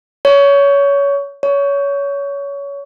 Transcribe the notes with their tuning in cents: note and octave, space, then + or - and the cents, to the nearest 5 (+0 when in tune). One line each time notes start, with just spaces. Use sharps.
C#5 +20
C#5 +20